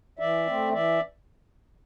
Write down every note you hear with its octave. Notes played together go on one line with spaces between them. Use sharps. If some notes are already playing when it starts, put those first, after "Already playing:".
E3 D5 E5
A3 C4
E3 D5 E5